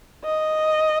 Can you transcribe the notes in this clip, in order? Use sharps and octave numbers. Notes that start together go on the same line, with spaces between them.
D#5